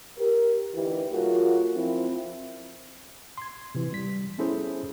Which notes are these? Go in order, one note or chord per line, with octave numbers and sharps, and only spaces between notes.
G4 A#4
D2 E3 D#4 E4 G4
F#3 A3 F4 F#4 G#4 A#4
F3 C4 E4
C6 G#6
C3 E3
G3 B6
B3 C#4 E4 G#4 A4 C5